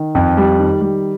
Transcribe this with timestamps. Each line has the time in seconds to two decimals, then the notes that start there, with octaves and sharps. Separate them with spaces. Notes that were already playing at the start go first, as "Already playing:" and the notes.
Already playing: D#3
0.15 F2
0.37 G3
0.59 D#3
0.81 G3